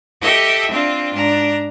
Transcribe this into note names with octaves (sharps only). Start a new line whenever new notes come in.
G4 A4 D#5 E5
C4 D4 F4
G#2 D4 A#5